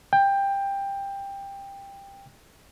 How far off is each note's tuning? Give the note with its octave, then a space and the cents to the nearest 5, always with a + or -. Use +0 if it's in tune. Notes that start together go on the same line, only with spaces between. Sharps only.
G5 +15